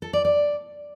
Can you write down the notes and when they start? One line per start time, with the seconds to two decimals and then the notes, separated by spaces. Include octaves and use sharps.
0.02 A4
0.13 D5
0.25 D5